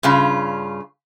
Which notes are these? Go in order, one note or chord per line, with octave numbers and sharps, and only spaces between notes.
G2 C#3 F4